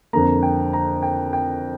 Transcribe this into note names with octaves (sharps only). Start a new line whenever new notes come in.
F2 D3 A#3 A#5
G5
A#5
G5
G5